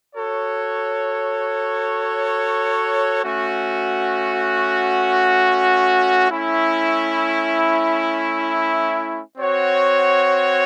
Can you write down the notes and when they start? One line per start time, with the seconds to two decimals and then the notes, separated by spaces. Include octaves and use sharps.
0.16 F#4 A4 C#5
3.24 A3 C#4 F#4
6.31 A3 C#4 E4
9.38 C4 F#4 C#5 F#5